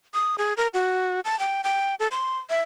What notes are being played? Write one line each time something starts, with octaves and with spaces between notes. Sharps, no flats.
D#6
G#4
A#4
F#4
A5
G5
G5
A4
C6
E5